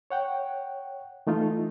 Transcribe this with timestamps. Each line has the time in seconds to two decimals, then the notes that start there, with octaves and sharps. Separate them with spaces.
0.11 C#5 F#5 G5
1.27 E3 A3 D#4 F4